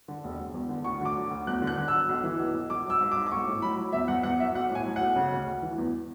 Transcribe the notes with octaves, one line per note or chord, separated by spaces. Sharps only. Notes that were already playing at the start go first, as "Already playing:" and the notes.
D3
E1
E1
E2
D3
D2 C#6
D3 D6
F#3
D2
E2 F#6
D3
F#6
D3
E6
F#3
B1
E3
B1
B1
G#1 D6
F#3 E6
G#2
D6
G#2
D6
B1 C#6
A2
F#3 B5
F#3
E2 E5
E2 F#5
E2 F#5
F#3 E5
B1 F#5
A2 G#5
F#3
F#5
B1
C#3
D2
D2
E3
E2